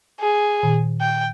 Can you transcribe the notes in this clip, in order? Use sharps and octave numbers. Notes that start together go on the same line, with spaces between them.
G#4
A#2 D#3
G5